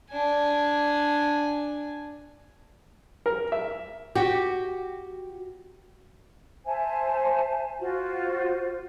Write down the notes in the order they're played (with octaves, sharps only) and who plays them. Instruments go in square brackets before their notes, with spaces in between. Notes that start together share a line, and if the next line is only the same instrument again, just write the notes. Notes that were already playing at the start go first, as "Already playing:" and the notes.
[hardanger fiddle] D4 G#5
[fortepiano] A#4
E5
[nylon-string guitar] F#4 G4
[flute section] C5 E5 G#5 A5
F4 F#4 C5